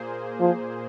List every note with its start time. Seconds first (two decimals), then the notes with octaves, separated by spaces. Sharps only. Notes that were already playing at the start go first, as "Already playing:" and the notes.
Already playing: A#2 A#3 G#4 C5
0.40 F3